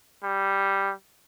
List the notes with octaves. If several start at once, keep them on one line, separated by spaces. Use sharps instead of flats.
G3